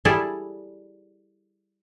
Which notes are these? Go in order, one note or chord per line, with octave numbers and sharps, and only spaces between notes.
G3 E4 G#4 A4 D5